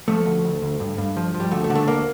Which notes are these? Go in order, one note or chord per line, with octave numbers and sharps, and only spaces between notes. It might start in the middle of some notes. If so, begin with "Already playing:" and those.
F3 A3
D2
D2
D2
G2
G2
F3
F3
G3
D2 A3
A3
D3
A3
D2 A#3